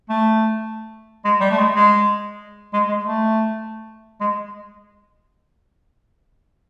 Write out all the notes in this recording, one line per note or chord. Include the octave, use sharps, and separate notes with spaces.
A3
G#3
G3
A3
G#3
G#3
G#3
G#3
A3
G#3